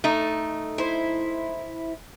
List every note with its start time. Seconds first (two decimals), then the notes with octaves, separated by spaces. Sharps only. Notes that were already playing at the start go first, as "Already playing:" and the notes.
0.04 A3 D#4
0.78 E4 C5